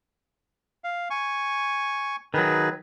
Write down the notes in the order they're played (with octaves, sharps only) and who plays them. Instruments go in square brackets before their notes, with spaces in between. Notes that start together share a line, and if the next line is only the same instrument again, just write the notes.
[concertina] F5
G#5 C#6
[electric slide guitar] D#3 F#3 [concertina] G#4 B4